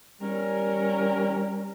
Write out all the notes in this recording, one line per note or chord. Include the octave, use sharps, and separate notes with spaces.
G3 C#4 A#4